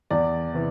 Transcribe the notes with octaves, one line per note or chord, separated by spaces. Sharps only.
E2 D5
C3 E3